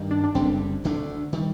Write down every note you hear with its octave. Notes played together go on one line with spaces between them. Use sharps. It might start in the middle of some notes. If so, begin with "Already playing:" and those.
Already playing: G2 D#3 G3 D#4
D4
D4
F#1 F#2 D3 G3 C4
D2 D3 A3 D4
D#3 G3